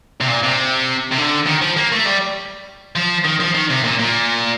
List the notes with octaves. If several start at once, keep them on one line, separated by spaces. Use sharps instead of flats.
C3
A#2
C3
C3
D3
D#3
F3
A#3
A3
G3
F3
D#3
F3
D#3
C3
A#2
A#2